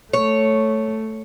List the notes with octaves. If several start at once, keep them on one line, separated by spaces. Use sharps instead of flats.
A3 C#5